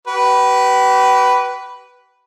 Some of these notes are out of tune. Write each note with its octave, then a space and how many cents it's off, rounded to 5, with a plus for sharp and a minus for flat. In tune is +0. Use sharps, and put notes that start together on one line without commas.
G4 -40 B4 +0